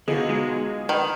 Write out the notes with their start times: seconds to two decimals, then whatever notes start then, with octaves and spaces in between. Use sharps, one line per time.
0.08 D3 B3 D#4 F4 F#4 G#4 D#5
0.29 G#3
0.89 D#3 B4